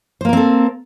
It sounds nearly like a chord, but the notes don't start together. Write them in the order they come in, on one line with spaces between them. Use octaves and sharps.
C5 A#3 A#4 C4 A4